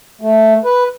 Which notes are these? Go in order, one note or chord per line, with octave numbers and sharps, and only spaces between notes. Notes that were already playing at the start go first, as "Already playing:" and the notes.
A3
B4